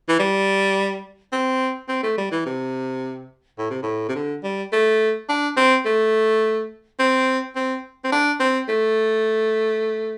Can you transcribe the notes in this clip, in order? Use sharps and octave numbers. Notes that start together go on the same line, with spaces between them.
E3
G3
C4
C4
A3
G3
E3
C3
A2
C3
A2
C3
D3
G3
A3
D4
C4
A3
C4
C4
C4
D4
C4
A3